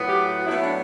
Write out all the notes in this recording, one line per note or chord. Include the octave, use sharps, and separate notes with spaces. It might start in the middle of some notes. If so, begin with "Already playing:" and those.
Already playing: A2 F#3 B3
G4
F#4
A2 F#3 B3 E4
D4